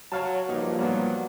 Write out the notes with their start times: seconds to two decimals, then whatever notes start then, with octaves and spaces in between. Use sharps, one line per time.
0.12 F#3 C#5 F5 A5
0.49 G2 F3 A#3 D#4
0.79 G2 A#2 F#3 B3